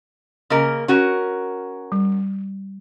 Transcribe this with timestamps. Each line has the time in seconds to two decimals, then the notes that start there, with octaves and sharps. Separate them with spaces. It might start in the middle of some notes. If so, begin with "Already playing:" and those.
0.50 C#3 A#3 A#4 D#5
0.88 C#4 F#4 A#4
1.92 G3